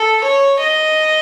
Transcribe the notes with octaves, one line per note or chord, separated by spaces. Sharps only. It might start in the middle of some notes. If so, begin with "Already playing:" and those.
Already playing: A4
C#5
D#5